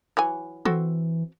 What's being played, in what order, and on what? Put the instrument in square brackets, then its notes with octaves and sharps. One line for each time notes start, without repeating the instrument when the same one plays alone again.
[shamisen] E3 F#3 G#5
[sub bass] E3 [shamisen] C4 F#4 A4